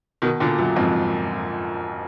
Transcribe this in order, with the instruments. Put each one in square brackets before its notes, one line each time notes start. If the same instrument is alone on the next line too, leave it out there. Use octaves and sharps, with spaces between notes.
[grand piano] B2 D#3
A#2 D3
F#2 A#2
F2 G#2